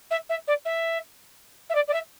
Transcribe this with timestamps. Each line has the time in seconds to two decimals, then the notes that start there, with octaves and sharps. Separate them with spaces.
0.10 E5
0.29 E5
0.47 D5
0.65 E5
1.69 E5
1.75 D5
1.88 D5
1.93 E5